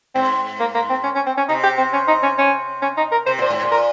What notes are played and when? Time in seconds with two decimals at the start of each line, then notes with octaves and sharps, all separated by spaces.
0.15 G#2 C4
0.60 A#3
0.75 A#3
0.90 C4
1.04 C#4
1.15 C#4
1.26 C4
1.37 C#4
1.48 C3 D#4
1.63 G4
1.78 C4
1.93 C#4
2.08 D#4
2.23 C#4
2.38 C#4
2.82 C#4
2.97 D#4
3.12 A#4
3.26 C3 C5
3.39 A#2 C5
3.50 G#2
3.62 A#2
3.71 A#4